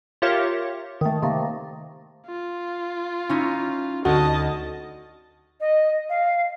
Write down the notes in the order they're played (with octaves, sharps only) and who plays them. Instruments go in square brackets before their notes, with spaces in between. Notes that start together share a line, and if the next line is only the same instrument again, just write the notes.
[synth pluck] F4 G4 A#4 C#5 E5 F5
D#3 A3
C3 D#3 A3 A#3
[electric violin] F4
[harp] C#4 D#4 E4
[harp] D2 [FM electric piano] F#4 [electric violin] D#5 A5
[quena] D#5
F5